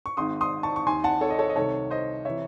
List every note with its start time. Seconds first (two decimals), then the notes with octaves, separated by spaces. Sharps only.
0.06 C#6
0.17 G#1 G#2 D#3 C6 D#6
0.41 C6 D#6
0.63 A5 C#6
0.76 C#6
0.86 D#2 D#3 G#5 C6
1.04 F#5 A5
1.21 A4 C#5
1.30 D#5
1.39 A4 C#5
1.50 D#5
1.56 C2 C3 D#3 A4 C#5
1.91 C5 D#5
2.25 C3 E3 C#5 E5